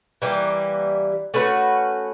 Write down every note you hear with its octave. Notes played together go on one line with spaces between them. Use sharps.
E3 G3 A#3
A3 C#4 F#4 B4